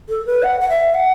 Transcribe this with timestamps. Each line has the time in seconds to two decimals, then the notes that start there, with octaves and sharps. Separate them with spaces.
0.09 A4
0.26 B4
0.43 F#5
0.61 F#5
0.69 E5
0.94 F#5